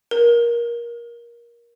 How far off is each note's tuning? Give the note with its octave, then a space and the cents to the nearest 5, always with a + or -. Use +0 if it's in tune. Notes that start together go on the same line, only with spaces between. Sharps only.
A#4 +20